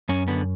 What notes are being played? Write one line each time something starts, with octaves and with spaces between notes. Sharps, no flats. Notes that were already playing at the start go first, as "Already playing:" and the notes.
F#2 C#4
D3 B3